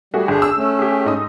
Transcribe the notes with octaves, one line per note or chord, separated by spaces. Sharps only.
G3 A3 F#4 G#4
G1 D4 G#4
E6
A3 C#4
G4 G#4
G#2 D#4 D#6